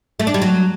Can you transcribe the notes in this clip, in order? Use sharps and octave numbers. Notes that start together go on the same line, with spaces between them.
A3
D4
G3
F#3